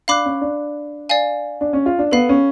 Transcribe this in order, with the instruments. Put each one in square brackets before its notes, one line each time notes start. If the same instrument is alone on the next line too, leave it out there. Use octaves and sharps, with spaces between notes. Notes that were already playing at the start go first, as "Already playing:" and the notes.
[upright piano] D4 [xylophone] F5 B5 D6 F#6
[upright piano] C#4
D4
[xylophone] D5 F5 G#5
[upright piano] D4
C#4
F4
D4
[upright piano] B3 [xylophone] A4 F5 B5
[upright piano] C#4